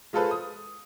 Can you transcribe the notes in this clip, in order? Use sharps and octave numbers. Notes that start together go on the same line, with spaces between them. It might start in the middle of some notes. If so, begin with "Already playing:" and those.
G#3 F4 G#4 A4 B4 C5
D#6